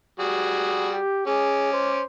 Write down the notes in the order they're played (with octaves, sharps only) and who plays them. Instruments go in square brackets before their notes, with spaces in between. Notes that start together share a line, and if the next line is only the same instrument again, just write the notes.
[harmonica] G3 F#4 G#4
[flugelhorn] G4
[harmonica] C#4 D6 [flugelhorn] G#4
[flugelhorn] C5